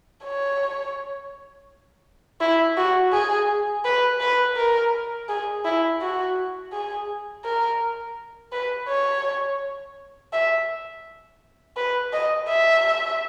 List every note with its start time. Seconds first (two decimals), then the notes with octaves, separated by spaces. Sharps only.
0.24 C#5
2.41 E4
2.77 F#4
3.13 G#4
3.85 B4
4.20 B4
4.57 A#4
5.29 G#4
5.64 E4
6.01 F#4
6.72 G#4
7.44 A#4
8.53 B4
8.89 C#5
10.33 E5
11.77 B4
12.13 D#5
12.49 E5